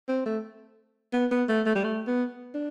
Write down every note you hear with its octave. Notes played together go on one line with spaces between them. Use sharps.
C4
A3
B3
B3
A3
A3
G3
A3
B3
D4